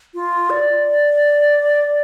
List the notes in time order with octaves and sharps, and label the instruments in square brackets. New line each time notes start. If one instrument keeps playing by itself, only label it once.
[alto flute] F4
D5